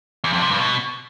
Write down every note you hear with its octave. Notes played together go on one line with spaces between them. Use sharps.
E2
F2
C3
G2
B2